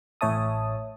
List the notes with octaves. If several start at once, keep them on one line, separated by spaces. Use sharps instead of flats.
A1 A2 C#5 E5 A5 D#6